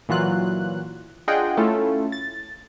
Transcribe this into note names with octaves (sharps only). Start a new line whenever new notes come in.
A#2 E3 F#3 F4 F#6
D4 F4 G#4 D#5 F#5 G5
A3 C#4 E4 F4 A4
A6